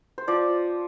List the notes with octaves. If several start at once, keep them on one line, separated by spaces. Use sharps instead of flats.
C5
F3 D5